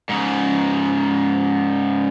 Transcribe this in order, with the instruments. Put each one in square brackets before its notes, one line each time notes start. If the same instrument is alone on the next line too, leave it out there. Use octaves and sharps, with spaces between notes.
[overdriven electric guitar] G#2 C#3